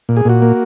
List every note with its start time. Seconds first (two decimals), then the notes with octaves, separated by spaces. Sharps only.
0.09 A#2
0.17 G#4
0.25 A#2 F#4
0.42 A#3